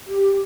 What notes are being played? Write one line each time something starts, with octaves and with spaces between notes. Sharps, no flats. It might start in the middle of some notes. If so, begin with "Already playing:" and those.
G4